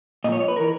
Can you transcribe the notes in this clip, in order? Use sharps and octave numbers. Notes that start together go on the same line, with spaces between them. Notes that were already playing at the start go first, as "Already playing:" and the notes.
A#2 F3 C#5 D#5
C#5
B4
E3 A#4